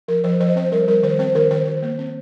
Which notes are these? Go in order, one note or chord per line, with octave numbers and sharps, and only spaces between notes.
F3 A#4
F3 C5
F3 C5
D#5
C4 C5
G3 A#4
G3 A#4
D#3 C5
C4 C5
D#3 A#4
D#3 C5
D#3
A#3
C4